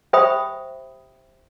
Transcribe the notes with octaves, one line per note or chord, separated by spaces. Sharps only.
G4 C5 E5 G5 B5 D#6